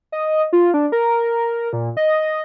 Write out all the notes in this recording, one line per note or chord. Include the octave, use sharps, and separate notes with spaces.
D#5
F4
D4
A#4
A#2
D#5